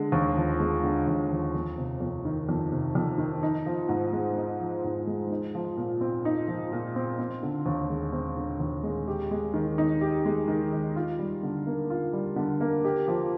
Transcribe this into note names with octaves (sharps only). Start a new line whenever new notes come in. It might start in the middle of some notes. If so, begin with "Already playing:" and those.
Already playing: D3 G#3
D#2
F3
G#3
D3
D#2
F3
F2
C3
F2
D#3
F2
C3
F2
D#3
D#4
F3
G#2
G#3
D#4
F3
G#2
G#3
D#4
F3
A#2
C4
D#4
F3
A#2
C4
C4
D3
D#2
G#3
C4
D3
D#2
G#3
G4
G#3
D#3
D#4
G4
G#3
D#3
D#4
F4
G3
D3
A#3
F4
G3
D3
A#3
G4
F3